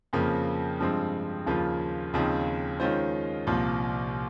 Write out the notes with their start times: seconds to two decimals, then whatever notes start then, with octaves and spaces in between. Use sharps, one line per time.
0.13 F2 C#3 F3 A#3
0.80 G2 F3 G#3 C4
1.46 D#2 C#3 F3 A#3 F4
2.13 D#2 C#3 F3 C4 D#4
2.80 D#3 G#3 C#4 F4 C5
3.47 C2 A#2 F3